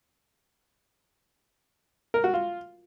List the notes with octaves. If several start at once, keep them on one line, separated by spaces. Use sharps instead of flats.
A#4
F#4
F4